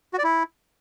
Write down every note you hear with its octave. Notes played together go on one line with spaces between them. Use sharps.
F#4
D5
E4